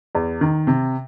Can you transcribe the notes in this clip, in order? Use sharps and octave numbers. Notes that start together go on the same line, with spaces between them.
E2
D#3
C3